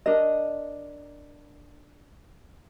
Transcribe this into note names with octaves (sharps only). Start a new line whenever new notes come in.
D4 A#4 D#5